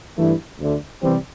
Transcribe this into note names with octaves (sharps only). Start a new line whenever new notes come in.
G2 E3 A3 E4
D2 D3 A3
C3 E3 G3 C4